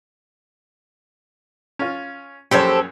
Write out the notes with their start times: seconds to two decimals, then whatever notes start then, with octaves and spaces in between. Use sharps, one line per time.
1.79 C#4 F4
2.51 A#1 F#2 G4 A4 C5 C#5